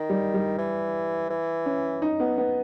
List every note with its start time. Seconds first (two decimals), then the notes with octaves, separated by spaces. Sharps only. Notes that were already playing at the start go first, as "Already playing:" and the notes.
Already playing: D#3
0.10 G3
0.34 G3
0.58 E3
1.30 E3
1.66 C#4
2.02 D#4
2.20 B3
2.38 B3